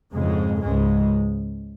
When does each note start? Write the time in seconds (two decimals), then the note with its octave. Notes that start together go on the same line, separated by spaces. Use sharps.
0.15 F2 G#2 C#3 G#3
0.62 C#2 G#2 C#3 G#3